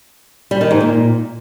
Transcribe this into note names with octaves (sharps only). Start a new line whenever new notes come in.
G3
D#3
G#2
A#2